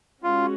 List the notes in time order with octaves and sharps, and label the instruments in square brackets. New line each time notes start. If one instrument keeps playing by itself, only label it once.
[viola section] G#3 C#4 F#4 [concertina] F4